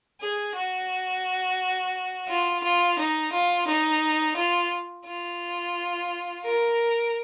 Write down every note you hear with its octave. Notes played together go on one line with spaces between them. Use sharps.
G#4
F#4
F4
F4
D#4
F4
D#4
F4
F4
A#4